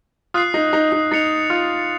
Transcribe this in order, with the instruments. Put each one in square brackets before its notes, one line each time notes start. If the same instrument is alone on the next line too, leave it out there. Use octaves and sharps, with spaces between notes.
[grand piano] F4 [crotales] D#6 F#6 C7
[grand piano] D#4
D#4
D#4
[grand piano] D#4 [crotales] A6 C#7 F7
[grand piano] F4